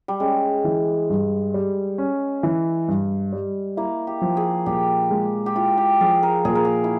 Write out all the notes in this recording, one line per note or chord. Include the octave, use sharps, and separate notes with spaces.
G3
G#3 C#4
E3
G2
G3
C#4
E3
G2
G3
A#3 E4
G4
F3
G#4
A#2 G4
G#3
G4
E4 F4
G4
F3 G#4
A#4
A#2 G#4
A#4
G#4
E4